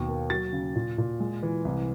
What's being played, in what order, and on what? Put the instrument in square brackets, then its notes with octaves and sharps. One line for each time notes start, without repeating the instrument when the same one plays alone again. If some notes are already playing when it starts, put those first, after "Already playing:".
Already playing: [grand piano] D#2 B2
A#3
F#3 A6
C#3
A#2
A#2
G#3
E3
C2